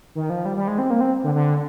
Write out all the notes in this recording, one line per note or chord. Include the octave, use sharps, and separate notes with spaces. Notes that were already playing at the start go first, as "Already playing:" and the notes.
D#3
F3
G3
G3
G#3
C4
A#3
C4
D3
D3